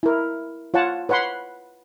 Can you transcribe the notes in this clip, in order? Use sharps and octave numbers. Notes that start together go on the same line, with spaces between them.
E4 A#4
F4 C#5 F#5 A5
B4 C#5 F#5 B5 C6